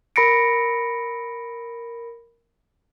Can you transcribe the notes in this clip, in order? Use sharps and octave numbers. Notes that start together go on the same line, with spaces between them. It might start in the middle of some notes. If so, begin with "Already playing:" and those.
A#4 B5 A#6 C#7 D7